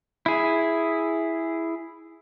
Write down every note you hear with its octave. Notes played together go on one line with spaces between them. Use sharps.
E4 G#4